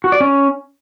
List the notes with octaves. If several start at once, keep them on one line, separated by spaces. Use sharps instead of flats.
F#4
D5
C#4